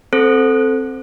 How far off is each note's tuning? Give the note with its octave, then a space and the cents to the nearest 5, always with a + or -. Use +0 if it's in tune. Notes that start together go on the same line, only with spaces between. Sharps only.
C4 +5 A4 +0 C5 -15